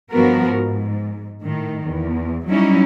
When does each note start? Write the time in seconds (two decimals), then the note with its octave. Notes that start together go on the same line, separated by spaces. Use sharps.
0.10 G2 F3 B3 F#4 A#4
0.47 G#2
1.42 A2 D#3
1.87 E2
2.47 F#3 G3 C#4 D#4 E4